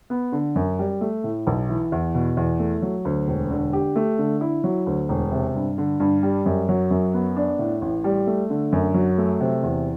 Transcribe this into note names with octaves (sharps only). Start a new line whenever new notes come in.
B3
D3
F#2
G3
A3
A2
B1
E3
E2
B2
E2
A3
F#3
D2
E1
D3
G4
A3
D3
E4
F#3
D2
E1
C3
G2
D3
G2
G3
F#2
F#3
F#2
B3
D4
A2
A1
G3
A3
D3
F#2
F#3
A3
C3
E2